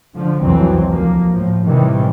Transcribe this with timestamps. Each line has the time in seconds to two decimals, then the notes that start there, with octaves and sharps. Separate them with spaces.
0.13 D3 F3
0.41 C2 F2 E3 F#3 C4
0.90 D2 F3 A#3
1.30 A2 F3
1.65 A2 C3 D#3 E3 G3